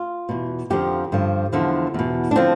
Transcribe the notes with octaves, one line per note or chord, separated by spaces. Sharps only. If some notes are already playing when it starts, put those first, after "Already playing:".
Already playing: F4
E2 B2
F2 D3 F3 G4
G2 D3 F3
E2 D3 F3
E2 B2
D4
D3 F3 C4